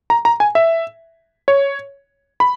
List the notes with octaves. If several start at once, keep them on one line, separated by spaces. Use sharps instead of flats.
A#5
A#5
G#5
E5
C#5
B5